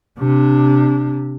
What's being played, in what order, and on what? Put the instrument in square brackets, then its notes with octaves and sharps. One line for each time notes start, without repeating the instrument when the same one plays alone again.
[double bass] C3 D4